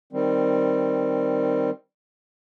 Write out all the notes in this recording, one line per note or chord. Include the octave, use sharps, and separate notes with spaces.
D#3 G3 C4